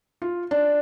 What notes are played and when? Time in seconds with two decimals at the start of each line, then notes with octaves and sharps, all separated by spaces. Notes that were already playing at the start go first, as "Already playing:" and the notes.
0.22 F4
0.51 D4